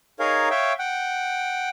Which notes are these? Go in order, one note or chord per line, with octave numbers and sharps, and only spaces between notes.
D#4 G#4 A#4 C#5 F5
C#5 E5 F5 G5
F#5 G5